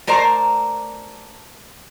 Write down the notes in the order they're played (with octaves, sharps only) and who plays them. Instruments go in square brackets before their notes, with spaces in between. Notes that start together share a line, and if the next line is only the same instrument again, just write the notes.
[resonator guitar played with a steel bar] A3 A#4 C5 D5 A#5